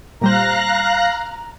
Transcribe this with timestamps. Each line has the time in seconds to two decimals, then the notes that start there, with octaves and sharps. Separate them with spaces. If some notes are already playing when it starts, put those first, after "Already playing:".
0.21 A#2 G3 C5 F5 A#5 F#6 A#6